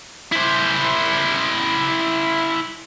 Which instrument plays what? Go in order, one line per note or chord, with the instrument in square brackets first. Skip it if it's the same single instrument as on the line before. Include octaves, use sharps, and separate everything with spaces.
[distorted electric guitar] E4 C5